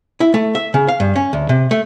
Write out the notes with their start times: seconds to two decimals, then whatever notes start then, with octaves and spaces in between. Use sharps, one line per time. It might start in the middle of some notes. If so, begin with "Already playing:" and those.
0.20 E4
0.34 A3
0.55 E5
0.74 C#3
0.88 F5
1.00 G2
1.16 C#4
1.33 D2
1.49 C3
1.71 A3